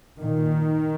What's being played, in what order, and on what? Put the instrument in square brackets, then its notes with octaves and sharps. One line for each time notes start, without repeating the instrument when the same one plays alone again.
[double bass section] A#2 D#3